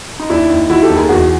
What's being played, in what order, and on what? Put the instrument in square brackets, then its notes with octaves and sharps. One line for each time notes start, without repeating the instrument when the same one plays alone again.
[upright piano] D#4
D#2 D4 E4
D#2
D#3 E4 F#4
G4 A4
D#2
G#4 A#4
E2 F#4 G#4